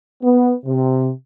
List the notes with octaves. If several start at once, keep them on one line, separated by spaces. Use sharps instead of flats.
B3
C3